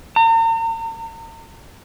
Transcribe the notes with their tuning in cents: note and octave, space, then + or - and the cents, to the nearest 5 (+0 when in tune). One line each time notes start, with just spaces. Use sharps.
A#5 -45